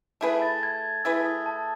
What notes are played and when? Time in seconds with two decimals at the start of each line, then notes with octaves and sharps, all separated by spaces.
0.21 A3 E4 G#4 B4
0.42 A6
0.63 G#6
1.04 A3 E4 G#4 B4 E6
1.25 D#6
1.46 A5